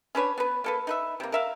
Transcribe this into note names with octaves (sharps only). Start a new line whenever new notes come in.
C#4 D4 B4 C#5
B3 B4
A#3 A4 B4
D#4 B4 E5
C3 A#3
A#4 E5 F5